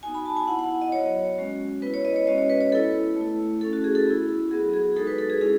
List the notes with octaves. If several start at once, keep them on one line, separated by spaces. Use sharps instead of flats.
B3 D#4 F#4 G#5
B5
A5
G#5
B3 E4 F#5
F#5
D#5
F#3 B3 F#4 C#5
G#3 C#4 F#4
B3 E4 B4
C#5
D#5
C#5
G#3 C#4 F#4 D#5
C#5
B4
C#5
B3 E4 A4
A3 E4
A3 C#4 E4 A4
F#4
G#4
A4
B3 E4
F#3 B3 F#4 G#4
G#4
G#3 D#4 F#4 A4
B4
A4
G#4
G#3 C#4 E4 G#4